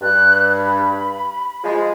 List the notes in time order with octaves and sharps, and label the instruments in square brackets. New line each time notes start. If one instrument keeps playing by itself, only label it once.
[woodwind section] G2 [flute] F#6
[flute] B5
[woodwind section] F3 G#3